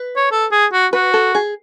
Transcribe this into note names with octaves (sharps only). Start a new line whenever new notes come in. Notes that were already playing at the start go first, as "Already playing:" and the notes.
Already playing: B4
C#5
A4
G#4
F#4
F#4 B4
A4
G#4